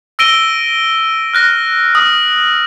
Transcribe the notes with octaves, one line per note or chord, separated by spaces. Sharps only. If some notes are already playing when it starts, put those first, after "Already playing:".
E6 A#6 D7 D#7 G7
F6 F#6 A#6
D#6